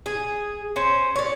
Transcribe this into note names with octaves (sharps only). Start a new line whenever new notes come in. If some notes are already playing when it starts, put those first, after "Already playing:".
G#4
C#4 C5
C#5 D5